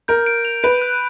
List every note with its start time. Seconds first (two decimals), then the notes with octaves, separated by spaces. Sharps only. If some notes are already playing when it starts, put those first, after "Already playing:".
0.08 A#4 G6
0.26 D7
0.45 F7
0.63 B4 D7
0.82 F#6